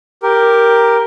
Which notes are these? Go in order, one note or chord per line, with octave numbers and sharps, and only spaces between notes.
G4 A#4